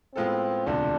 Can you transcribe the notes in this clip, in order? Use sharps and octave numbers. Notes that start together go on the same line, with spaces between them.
A2 G#3 B3 C4 F4 A4
E1 D2 C3 F3 D4